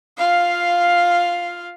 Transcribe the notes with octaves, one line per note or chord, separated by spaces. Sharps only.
F4 F5